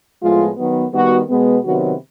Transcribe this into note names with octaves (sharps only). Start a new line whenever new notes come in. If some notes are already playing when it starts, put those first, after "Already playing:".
A2 F3 G#3 B3 F4
D#3 F#3 B3
D#3 G3 B3 F#4
B2 G#3 B3
C3 D#3 F#3 B3 F#4